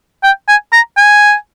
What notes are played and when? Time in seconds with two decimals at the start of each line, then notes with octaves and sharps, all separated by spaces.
0.23 G5
0.48 G#5
0.72 A#5
0.97 G#5